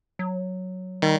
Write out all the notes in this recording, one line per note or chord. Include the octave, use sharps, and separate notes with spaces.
F#3
D#3 G3